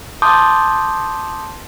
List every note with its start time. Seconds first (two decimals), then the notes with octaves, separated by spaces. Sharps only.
0.22 A5 C6 D6 D#6 G6